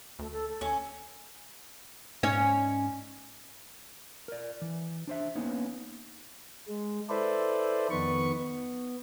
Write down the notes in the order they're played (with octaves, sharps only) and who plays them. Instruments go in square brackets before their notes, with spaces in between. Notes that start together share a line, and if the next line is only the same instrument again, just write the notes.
[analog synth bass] D2 [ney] A3
[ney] A4
A4
[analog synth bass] D#2 [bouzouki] C#4
[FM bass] G#2 [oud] C#4 C#5 D#5
[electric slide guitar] A#4 D5
E3
D4 C5 E5
A#3 B3 C#4 D#4
[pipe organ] G#3
E4 A4 B4 C5 D5
F2 D#3 B3 B4 C#6
B3